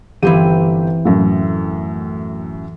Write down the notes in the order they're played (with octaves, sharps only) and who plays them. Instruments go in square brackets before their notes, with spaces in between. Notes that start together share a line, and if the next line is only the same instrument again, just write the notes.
[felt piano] G1 G4 [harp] E3 C4 D#7
[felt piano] F#2 A2